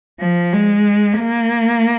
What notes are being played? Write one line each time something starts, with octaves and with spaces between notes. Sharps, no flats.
F3
G#3
A#3